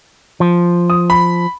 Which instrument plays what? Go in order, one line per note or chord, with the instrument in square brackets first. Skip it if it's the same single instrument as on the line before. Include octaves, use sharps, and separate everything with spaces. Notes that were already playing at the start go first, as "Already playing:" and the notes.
[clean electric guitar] F3
[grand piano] D#6
B5